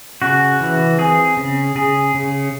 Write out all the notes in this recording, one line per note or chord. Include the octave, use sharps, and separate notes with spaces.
C#3 F#4
E3
C4 G#4
C#3
C#3 G#4
C#3